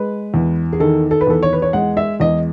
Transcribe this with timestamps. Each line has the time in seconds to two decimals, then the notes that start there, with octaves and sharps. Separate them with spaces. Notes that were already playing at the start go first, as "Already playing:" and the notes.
Already playing: G#3 B4
0.34 E2
0.73 G#4
0.80 D#3 A4
1.11 A4
1.21 B4
1.27 E2 A4
1.43 C#5
1.53 B4
1.62 C#5
1.73 G#3 F#5
1.97 E5
2.20 E2 D#5